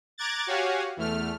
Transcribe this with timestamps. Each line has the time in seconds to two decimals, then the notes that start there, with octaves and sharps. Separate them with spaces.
0.18 A#5 D6 F#6 G#6 A6
0.47 F#4 G4 C#5 F5 F#5 G#5
0.97 E2 A3 F6